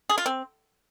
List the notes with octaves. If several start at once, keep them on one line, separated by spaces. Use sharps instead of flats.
G#4
F4
C4